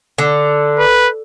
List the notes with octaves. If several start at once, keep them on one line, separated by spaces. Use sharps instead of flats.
D3
B4